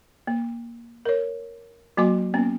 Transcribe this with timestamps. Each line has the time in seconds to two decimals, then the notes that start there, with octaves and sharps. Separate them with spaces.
0.27 A#3
1.05 A#4 C#5
1.97 F#3 A#3 F#4 G#5 C6 D6
2.34 A#3 B3 C#4